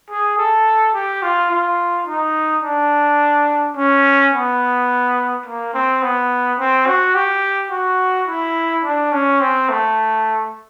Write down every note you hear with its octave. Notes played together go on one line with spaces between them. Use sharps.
G#4
A4
G4
F4
F4
D#4
D4
C#4
B3
A#3
C4
B3
C4
F#4
G4
F#4
E4
D4
C#4
C4
A3